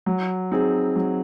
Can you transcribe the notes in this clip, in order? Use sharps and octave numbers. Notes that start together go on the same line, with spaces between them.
F#3
C4 D#4 G#4
F#3